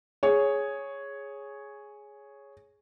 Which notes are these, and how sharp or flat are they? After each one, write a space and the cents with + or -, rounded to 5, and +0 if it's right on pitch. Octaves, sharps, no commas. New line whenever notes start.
G#4 +0 C#5 +0